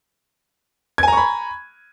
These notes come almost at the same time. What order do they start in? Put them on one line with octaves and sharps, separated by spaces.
G#6 G#5 A#5 C#6 B5